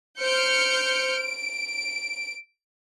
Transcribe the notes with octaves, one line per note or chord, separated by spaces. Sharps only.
C5 F6 G6 C#7 D7
D7